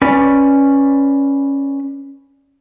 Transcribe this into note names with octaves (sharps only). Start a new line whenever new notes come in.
C#4 B4 D5